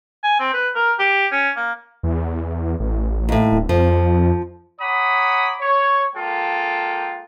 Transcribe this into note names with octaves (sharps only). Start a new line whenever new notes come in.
G#5
C4
B4
A#4
G4
C#4
A#3
E2
A1
D#2 A2
D1
F2 F3
C#5 F#5 A#5 B5 D6 D#6
C#5
G#3 A#3 F4 A4 G5